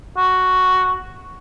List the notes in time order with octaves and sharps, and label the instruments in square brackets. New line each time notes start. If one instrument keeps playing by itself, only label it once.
[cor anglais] F#4